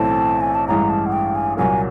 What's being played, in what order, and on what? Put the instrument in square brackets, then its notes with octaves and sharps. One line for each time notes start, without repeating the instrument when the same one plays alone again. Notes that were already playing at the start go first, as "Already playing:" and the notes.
Already playing: [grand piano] B1 A2 E3 A3 C4 [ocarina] A5
[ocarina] G#5
A5
[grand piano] A1 G2 E3 G#3 [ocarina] A#5
[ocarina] A5
F#5
G5
G#5
[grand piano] C2 A#2 F#3 A#3 [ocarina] G#5